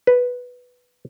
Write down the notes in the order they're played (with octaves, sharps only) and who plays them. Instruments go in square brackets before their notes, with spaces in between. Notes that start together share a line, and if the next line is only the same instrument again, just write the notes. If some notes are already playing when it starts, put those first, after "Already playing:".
[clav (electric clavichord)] B4